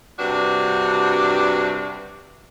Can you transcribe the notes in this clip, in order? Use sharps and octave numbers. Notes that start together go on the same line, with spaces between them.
G2 C3 D4 F#4